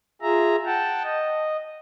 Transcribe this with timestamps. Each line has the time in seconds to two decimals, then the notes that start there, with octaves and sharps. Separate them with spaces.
0.22 F4 G#4 E5 A#5
0.66 F#5 G5 A5
1.04 D#5